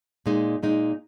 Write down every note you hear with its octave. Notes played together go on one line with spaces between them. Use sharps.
A#2 G#3 D#4
A#2 G#3 D#4